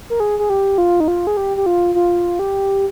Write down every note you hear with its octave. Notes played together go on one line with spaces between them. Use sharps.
A#4
G#4
G#4
G4
F4
D#4
F4
G#4
G4
G4
F4
F4
G4